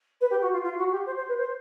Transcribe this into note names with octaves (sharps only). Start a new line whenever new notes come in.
B4
G4
F#4
F4
F4
F#4
G4
C5
C5
B4
C5